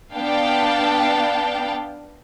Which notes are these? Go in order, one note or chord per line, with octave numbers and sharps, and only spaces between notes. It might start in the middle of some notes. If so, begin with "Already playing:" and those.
B3 D4 F5 G5 A5